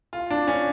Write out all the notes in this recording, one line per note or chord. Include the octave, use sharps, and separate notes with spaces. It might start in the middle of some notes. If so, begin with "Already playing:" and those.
F4
D4
C#4